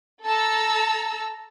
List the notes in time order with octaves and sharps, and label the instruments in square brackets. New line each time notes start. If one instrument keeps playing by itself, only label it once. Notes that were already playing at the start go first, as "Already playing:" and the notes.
[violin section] A4 A5 A#5 E6